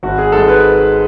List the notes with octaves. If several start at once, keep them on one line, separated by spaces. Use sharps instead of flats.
G#1 F#4
G#4
G#2 G#3 A4
B4